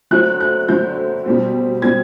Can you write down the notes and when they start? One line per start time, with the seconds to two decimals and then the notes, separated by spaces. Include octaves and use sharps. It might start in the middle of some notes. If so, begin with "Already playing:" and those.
0.11 D3 F#3 A3 C4 F#6
0.41 F#6
0.68 D3 F#3 A3 C4 G6
1.26 B2 G3 C4
1.82 B2 G3 C4 G#6